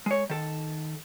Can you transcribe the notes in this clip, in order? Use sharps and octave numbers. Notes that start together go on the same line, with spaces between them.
G#3 C#5
D#3 A4